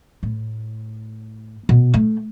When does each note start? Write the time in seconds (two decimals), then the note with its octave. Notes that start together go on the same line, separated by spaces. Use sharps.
0.23 A2
1.69 B2
1.94 A3